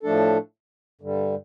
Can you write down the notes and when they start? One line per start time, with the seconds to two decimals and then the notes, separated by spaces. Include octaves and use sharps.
0.03 A2 F3 A3 D4 A4
1.01 G2 D3 G3